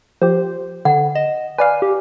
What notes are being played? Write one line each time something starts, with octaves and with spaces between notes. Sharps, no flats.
F3 G4 C5
D3 F#5
D#5 E7
B4 D5 F5 G#5
G4